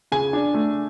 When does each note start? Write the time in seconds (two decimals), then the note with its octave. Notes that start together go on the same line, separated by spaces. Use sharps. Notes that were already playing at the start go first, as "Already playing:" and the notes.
0.12 C#3 G#5
0.33 D4
0.54 A3